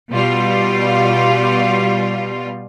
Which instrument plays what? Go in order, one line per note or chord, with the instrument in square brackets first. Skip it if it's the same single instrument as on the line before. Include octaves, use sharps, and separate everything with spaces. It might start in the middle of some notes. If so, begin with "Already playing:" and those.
[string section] B2 G3 F4